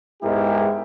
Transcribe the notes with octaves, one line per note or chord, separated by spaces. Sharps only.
G#2 G#3 B3 E4 G4 A#4